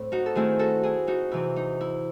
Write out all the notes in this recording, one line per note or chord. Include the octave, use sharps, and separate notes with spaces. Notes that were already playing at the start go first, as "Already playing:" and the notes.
Already playing: A2 C4
D#4 F#4
A4
D#3 A3 C4 E4 G#4
F#4 A4
E4 G#4
D#4 F#4
C3 E3 C4 E4
D#4
E4